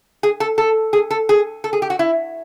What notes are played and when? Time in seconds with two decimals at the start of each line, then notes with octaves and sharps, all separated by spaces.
0.23 G#4
0.40 A4
0.58 A4
0.93 G#4
1.10 A4
1.29 G#4
1.64 A4
1.73 G#4
1.82 G4
1.90 F#4
1.99 E4